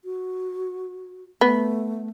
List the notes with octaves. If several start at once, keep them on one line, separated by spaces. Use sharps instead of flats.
F#4
A3 B3